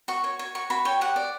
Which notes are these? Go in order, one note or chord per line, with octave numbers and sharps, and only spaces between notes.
F#4 C#6
C#5
C#5
F#4 C#6
F#4 B5
C#5 G5
G4 F#5
D5